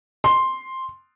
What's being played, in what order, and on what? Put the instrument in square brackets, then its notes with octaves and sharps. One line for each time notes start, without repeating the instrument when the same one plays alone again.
[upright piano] C6